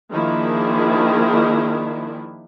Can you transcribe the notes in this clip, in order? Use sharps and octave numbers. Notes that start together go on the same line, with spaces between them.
D#3 F3 A#3 D4 E4 G#4